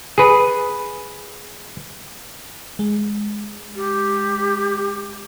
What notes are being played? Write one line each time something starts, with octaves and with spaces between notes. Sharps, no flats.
G#4 B4
G#3
G4